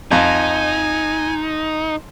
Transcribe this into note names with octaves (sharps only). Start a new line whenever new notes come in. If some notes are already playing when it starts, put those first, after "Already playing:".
F2 D#4 G#5